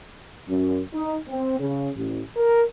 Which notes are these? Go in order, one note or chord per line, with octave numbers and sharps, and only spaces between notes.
F#2
D#4
C4
C#3
A1
A#4